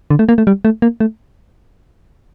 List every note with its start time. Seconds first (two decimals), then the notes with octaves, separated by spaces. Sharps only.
0.10 D3
0.19 A3
0.29 A#3
0.38 A3
0.47 G3
0.65 A3
0.82 A#3
1.00 A3